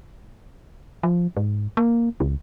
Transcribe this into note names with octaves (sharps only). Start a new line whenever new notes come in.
F3
G#2
A#3
C#2